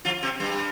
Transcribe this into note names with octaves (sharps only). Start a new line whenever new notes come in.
F3 F4
C3 C4
G2 G3